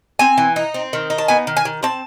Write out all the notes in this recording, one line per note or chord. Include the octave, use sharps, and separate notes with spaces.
C4 G#5
E3
D#4
C4
D#3
D#4
A5
B3 G#5
D#3
G#5
D#3
C4 A5